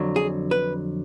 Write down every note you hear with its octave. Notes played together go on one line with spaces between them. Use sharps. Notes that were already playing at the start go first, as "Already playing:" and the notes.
Already playing: F2 D3 F#3
G#4
B4